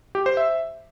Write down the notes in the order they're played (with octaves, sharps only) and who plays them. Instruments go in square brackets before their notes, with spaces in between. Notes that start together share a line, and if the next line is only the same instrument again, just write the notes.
[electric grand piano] G4
C5
E5